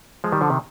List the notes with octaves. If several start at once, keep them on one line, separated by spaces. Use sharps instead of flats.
F3 G#3
D#3 G3
D3 F3
C3 D#3